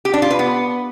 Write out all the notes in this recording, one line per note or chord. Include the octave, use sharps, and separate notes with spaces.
G4
D4
F4
B4
B3